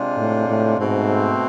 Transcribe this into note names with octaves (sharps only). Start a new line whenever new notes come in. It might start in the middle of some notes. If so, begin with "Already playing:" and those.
Already playing: C3 G#3 D4 F4
A2
A2
G#2 B2 A3 C4